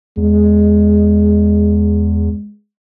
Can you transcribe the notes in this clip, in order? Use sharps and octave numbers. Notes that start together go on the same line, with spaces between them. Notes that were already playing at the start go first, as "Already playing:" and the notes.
E2 G#3